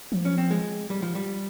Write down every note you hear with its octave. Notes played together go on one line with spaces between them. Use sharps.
F3
C#4
C4
G#3
G3
F3
G3